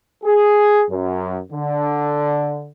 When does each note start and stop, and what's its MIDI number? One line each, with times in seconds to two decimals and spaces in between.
0.24 0.84 68
0.89 1.39 42
1.52 2.69 50